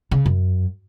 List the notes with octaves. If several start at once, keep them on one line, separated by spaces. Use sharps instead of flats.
C#3
F#2